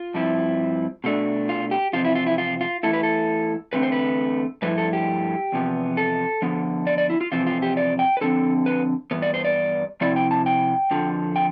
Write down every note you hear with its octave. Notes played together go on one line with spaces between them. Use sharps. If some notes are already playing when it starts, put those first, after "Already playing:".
Already playing: F4
G2 F3 C4 E4
B2 A3 D4
F4
G4
E2 C3 F3 C4 F4
E4
F4
E4
F4
F4
E2 B2 A3 E4 A4
B4
A4
E2 D3 A3 C4 B4
C5
B4
G2 F3 A3 E4 B4
A4
G4
E2 C3 F3 B3
A4
D3 F3 B3
D5
D5
E4
F4
E2 C3 F3 C4 F4
F4
G4
D5
G5
B4
D3 F3 C4 A4
B4
G2 E3 B3
D5
C5
D5
C3 F3 C4 E4 D5
G5
A5
G5
F2 D3 F3
G5